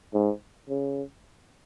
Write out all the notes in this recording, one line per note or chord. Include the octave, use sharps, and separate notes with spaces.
G#2
C#3